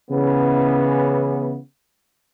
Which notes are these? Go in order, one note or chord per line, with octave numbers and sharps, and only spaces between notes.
C#3 E3 B3